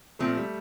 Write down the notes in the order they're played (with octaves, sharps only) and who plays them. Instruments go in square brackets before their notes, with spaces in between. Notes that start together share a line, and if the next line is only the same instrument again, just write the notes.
[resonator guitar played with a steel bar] A#2 F3 C4 [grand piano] A3
[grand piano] G3